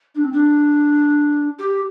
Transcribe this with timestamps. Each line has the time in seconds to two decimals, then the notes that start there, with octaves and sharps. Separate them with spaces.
0.15 D4
0.24 C4
0.33 D4
1.59 G4